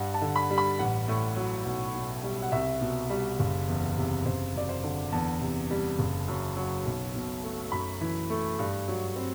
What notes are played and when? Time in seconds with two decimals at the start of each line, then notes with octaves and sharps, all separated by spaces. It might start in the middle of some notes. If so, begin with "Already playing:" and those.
Already playing: G2 F#5
0.14 A5
0.21 D3
0.36 B5
0.50 G3
0.58 B5
0.79 A1 F#5
1.08 A2
1.36 F#3
1.66 B1
1.94 B2
2.23 G3
2.42 F#5
2.52 C2 E5
2.81 B2
3.10 G3
3.39 F#1
3.68 E2
3.96 C3
4.25 F#1 C5
4.55 F#2 D5
4.69 C5
4.84 D3
5.12 E2 A5
5.41 C3
5.70 G3
5.99 F#1
6.28 F#2
6.56 F#3
6.85 B1
7.15 B2
7.43 A3
7.72 F#2 B5
8.01 E3
8.30 A3
8.59 G2
8.88 F#3
9.16 C4